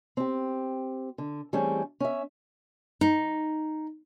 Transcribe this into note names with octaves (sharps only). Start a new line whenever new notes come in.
C4 G4
D3
E3 G3 A3 C4 C#4 G#4
C#4 E5
D#4